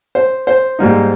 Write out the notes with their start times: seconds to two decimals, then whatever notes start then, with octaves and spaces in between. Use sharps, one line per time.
0.15 C5
0.47 C5
0.79 G#2 G3 A#3 D#4